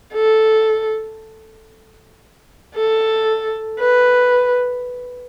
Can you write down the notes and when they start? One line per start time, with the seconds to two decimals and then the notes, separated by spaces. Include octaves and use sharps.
0.14 A4
2.75 A4
3.79 B4